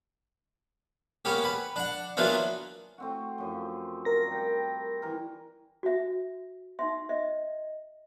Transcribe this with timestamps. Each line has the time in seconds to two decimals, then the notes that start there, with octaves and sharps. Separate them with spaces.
1.25 A#3 B3 C#4 G4
1.44 B4
1.76 D4 F#5
2.17 E3 F#3 A#3 B3 D4 F4
2.98 A3 C4 F#4
3.38 F#2 F3
4.05 A#4 A#6
4.27 G3 G5
5.02 E3 A#4
5.83 F#4 E5
6.79 D#4 E5 C6
7.09 D#5 E5